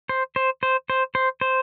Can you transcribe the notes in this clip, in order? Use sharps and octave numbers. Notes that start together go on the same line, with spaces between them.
C5
C5
C5
C5
C5
C5